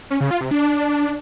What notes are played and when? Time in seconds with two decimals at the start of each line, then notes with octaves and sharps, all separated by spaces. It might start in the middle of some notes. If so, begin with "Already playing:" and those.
0.10 C#4
0.21 C#3
0.31 F4
0.41 C3
0.51 D4